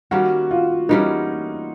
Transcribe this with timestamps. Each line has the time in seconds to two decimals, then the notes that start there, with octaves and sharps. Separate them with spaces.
0.11 D#3 G3 A#3 C#4 F#4
0.51 F4
0.89 E3 G3 A#3 C#4 D#4